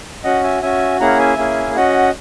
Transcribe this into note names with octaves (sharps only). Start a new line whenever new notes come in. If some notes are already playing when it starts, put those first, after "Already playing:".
C#4 F#4 D#5 F#5
E5 G#5
C#4 F#4 E5 G#5
A#3 C#4 E4 G#4 F#5 A#5
E5 G#5
A#3 C#4 E4 G#4
C#4 F#4 D#5 F#5